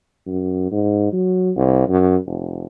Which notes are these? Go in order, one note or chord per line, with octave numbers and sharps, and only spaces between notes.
F#2
G#2
F#3
C2
F#2
F1